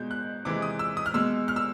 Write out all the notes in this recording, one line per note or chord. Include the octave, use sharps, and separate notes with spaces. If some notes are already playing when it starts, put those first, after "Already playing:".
Already playing: B2 G#3 G6
F#6
C3 E3 G#3 D6
D#6
E6
D#6
F6
B2 G#3 E6
F6
E6